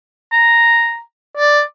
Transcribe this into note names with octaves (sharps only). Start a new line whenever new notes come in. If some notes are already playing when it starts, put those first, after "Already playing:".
A#5
D5